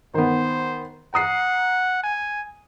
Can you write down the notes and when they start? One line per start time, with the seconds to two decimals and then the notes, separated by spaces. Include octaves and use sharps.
0.14 D#3 B3 C5
1.14 F#5 A#5 D#6 C7
2.04 G#5